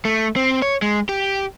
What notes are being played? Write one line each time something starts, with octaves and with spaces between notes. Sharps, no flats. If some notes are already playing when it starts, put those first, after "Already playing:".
A3
C4
C#5
G#3
G4